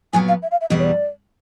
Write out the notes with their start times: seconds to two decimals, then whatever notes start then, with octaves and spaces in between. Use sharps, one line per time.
0.13 A#2 F#3 B3 G#5
0.28 F5
0.42 E5
0.51 F5
0.61 E5
0.70 E2 B2 G3 D#5
0.79 C#5
0.84 D5